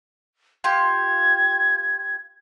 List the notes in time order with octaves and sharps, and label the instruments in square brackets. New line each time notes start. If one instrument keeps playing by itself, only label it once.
[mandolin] F4 G4 [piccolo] G#6